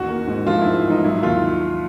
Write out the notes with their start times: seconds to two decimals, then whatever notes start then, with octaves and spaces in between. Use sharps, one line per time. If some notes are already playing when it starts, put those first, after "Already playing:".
Already playing: A1 D#2 F#4
0.08 A#3
0.27 G#2
0.47 F3 F4
0.62 G#2 E4
0.85 A1
0.90 D#4
1.04 F#3 E4
1.23 D#2 F4